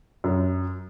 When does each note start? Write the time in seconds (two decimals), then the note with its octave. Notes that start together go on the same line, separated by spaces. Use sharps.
0.24 F#2